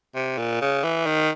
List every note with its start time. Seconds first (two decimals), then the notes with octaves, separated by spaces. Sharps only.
0.15 C3
0.38 A#2
0.61 C#3
0.83 E3
1.06 D#3